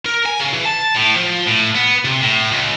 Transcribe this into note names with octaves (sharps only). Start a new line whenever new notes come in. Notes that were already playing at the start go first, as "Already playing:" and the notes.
A#4
G#5
C#3
E3
A5
A2
F3
A2
B3
C3
A2
C#2